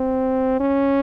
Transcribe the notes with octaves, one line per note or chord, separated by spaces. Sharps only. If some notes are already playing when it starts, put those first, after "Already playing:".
Already playing: C4
C#4